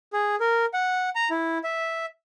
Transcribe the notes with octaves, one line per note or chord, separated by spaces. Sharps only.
G#4
A#4
F#5
A#5
E4
E5